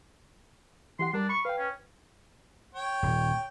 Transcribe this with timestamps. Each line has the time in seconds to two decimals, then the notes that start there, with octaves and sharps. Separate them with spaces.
0.99 E3 G4 F#5 C6
1.13 G3 D4 A#4
1.29 B5 C#6
1.45 B4 F5 G5
1.58 C#4
2.74 C#5 G5
3.03 D#1